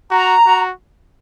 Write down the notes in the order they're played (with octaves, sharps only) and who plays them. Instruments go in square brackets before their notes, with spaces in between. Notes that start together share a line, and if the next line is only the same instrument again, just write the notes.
[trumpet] F#4 [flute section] A#5
[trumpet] F#4